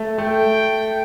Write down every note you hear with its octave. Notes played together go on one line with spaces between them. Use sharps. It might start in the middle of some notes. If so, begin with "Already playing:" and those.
Already playing: A3
A3 G5